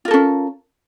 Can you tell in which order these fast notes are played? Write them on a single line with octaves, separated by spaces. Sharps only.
F4 A#4 A4 C#4